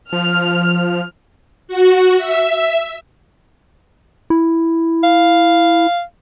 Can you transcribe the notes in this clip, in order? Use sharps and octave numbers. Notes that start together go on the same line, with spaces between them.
F3 F6
F#4
E5
E4
F5